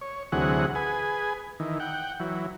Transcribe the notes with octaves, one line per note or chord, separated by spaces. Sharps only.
C#5
D2 C3 E3 F#3 G#4 F#5
G#4 B4 G#5
D#3 E3
F#5 G5
E3 F#3